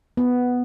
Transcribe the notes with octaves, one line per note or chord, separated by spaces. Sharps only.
B3